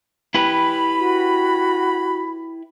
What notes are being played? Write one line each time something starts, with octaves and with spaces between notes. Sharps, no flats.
E4 G4 B4 B5
F#4